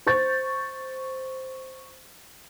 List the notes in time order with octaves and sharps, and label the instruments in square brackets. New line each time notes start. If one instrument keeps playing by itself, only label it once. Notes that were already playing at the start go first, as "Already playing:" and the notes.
[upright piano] C5 C#6 G6 A6